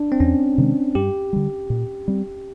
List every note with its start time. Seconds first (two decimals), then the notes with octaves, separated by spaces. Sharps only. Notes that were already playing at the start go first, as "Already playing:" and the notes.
Already playing: D4
0.12 C4
0.20 E2 C#4
0.58 C3 D#3 G#3
0.95 G2 G4
1.33 D3 G3
1.70 A#2
2.08 G3 C4